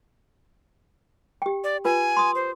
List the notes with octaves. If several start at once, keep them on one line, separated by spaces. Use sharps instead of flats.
G4 G5
D5
F4 B4 G#5
C6 D#6
C5